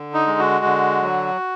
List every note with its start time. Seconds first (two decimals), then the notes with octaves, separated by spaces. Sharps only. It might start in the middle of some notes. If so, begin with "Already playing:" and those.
Already playing: D3
0.14 D#4
0.27 G#3
0.39 F#4
0.65 D3
1.02 F#3